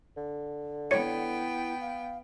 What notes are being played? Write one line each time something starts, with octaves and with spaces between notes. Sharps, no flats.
D3
B3 E4 C#5 D5 G5 C#7
F5